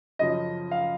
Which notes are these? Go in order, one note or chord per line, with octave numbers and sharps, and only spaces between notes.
F#2 C#3 F3 D#5
F5